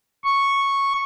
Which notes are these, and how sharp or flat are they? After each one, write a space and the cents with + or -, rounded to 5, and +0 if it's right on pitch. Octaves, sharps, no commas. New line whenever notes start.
C#6 -5